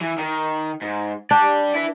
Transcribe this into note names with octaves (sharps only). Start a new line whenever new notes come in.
E3
D#3
G#2
D4 D5 G5
E4 B4